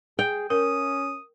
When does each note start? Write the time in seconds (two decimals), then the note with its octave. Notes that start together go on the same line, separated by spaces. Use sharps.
0.19 G#4 G5
0.50 C#4 A#4 D#6